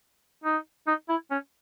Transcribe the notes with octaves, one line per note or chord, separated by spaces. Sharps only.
D#4
D#4
E4
C#4